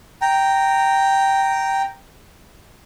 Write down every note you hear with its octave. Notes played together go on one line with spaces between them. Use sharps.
G5 A#5